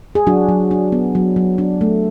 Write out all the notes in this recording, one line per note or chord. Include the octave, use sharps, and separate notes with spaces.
G#4
F#3 D4 F#4
F#3
D4
B3
F#3
F#3
D4
A3